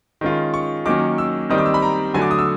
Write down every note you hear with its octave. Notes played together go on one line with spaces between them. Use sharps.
D#3 G#3 C#4 F4
C#6
D#3 F#3 A#3 C#4 D6
E6
D#3 G3 C4 D#4 D#6
D6
E6
B5
A#5
D3 F#3 A3 G#5
D6
D#6
E6